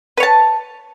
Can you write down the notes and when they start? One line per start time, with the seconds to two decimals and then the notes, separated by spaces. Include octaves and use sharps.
0.17 B4
0.20 C#5
0.23 A5